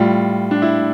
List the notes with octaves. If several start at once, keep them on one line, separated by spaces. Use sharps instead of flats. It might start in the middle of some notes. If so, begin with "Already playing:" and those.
Already playing: A2 G3 F4
D4
E4